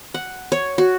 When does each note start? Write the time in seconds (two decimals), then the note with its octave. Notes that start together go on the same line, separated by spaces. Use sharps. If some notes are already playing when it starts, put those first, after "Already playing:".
0.14 F#5
0.52 C#5
0.78 F#4